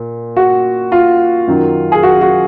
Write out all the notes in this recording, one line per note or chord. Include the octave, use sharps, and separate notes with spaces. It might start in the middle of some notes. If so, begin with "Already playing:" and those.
Already playing: A#2
F#4
F4
F#2 D#3 F#3
G#4
F#4
F#4